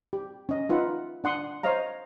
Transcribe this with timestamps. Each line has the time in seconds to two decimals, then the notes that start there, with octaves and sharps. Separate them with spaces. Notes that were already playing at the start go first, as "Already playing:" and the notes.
0.13 G4
0.49 C#4 D#5
0.69 D#4 F4 B4 E5 F#5
1.24 D4 F#5 C6 D#6
1.63 C5 C#5 D#5 F5 A#5